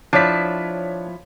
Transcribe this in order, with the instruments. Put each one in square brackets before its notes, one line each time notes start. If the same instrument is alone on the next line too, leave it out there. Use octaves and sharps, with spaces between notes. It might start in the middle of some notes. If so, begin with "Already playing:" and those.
[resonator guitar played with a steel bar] F3 E4 [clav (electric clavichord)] D4 [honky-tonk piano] C#5 B6